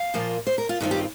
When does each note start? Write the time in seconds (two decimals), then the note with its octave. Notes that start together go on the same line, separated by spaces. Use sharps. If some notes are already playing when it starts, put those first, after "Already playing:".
Already playing: F5
0.14 A#2 F3 A#3 F4
0.47 C5
0.58 A#4
0.69 F4
0.81 G2 D#3 C4 F4
0.91 G4